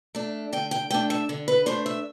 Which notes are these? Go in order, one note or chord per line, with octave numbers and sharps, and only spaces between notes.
A3 D4
D3 G5
G5
A3 D4 G5
E5
D3
B4
A3 D4 C5
E5